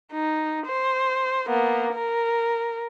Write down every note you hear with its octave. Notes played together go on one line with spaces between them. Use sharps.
D#4
C5
A#3 B3
A#4